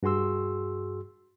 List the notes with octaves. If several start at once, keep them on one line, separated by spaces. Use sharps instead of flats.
G2 F#4 G#4 C6 E6